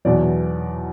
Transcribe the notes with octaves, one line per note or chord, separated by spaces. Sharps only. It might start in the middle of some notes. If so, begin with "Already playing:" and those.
E2 B2 F#3 D5